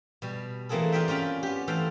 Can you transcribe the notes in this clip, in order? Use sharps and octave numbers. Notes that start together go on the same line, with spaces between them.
B2 G3
E3 A3 A#3 C4 G#4 A4
F4 G4 G#4 D5 E5 G5
C#4 F4 D5 G5 B5
B3 G4
E3 A3 A4 C5 F5 G5